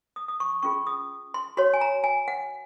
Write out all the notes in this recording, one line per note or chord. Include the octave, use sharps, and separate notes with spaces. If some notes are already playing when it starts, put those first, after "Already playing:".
D#6
D#6
C#6
C#4 F4 G#4 C#6
D#6
C6
F#4 C#5 C6
G#5
A#5
G#5
F#5